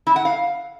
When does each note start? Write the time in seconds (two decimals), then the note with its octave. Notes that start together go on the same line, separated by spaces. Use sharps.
0.07 E4
0.16 F#5
0.25 F5